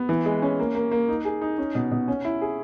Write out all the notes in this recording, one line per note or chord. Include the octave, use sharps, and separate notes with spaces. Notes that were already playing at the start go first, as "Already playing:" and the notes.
Already playing: B3
E3
G#3
C#4
A#3
A#3
A#3
D#4
G#4
D#4
C#4
B2
B2
C#4
E4
G#4